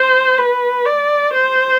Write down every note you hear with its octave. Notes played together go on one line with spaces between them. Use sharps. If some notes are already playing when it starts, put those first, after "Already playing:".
Already playing: C5
B4
D5
C5